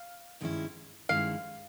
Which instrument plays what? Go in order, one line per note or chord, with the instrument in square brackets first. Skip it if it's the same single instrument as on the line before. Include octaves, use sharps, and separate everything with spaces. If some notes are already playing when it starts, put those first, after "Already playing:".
Already playing: [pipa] F5
[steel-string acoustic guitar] G2 D#3 G#3 C#4 E4
[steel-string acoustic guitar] G2 D#3 G#3 C#4 E4 [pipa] F5